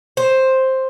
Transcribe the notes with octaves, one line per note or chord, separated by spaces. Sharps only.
C5